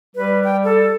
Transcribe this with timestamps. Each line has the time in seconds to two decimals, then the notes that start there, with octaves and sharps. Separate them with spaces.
0.16 G3 B4
0.44 G5
0.64 A4